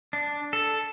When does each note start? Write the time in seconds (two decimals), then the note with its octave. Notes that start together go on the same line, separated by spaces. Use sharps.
0.13 D4
0.53 A4